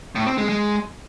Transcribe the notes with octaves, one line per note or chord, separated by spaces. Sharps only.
A2
C4
G#3
G#3